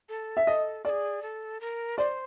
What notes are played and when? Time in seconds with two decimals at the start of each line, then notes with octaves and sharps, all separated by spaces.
0.09 A4
0.37 E5
0.47 A4 D#5
0.85 G#4 A4 D5
1.22 A4
1.61 A#4
1.98 C5 D5